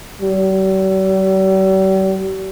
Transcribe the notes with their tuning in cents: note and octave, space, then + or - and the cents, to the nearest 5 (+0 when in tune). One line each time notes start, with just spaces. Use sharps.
G3 -45